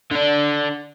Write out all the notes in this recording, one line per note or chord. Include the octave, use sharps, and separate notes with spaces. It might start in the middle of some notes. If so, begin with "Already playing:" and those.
D3 D4